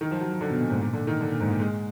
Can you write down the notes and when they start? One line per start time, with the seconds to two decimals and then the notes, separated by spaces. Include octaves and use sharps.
0.01 D#3
0.11 F3
0.21 F#3
0.31 F3
0.41 D3
0.50 B2
0.61 A#2
0.70 G#2
0.81 A#2
0.93 D3
1.07 D#3
1.21 D3
1.31 A#2
1.40 G#2
1.50 A#2
1.60 G#3